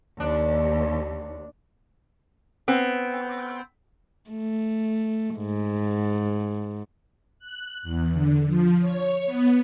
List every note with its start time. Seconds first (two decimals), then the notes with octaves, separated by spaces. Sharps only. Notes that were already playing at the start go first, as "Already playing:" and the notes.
0.20 D#2 D4
2.68 B3 C4
4.30 A3
5.37 G#2
7.39 F#6
7.83 E2
8.13 D3
8.46 F3
8.81 C#5
9.25 B3